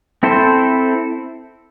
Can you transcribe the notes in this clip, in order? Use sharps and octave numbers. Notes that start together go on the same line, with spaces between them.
C4 E4 A4 C5